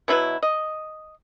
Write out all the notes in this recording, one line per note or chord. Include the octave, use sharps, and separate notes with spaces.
B2 F#3 E4 B4
D#5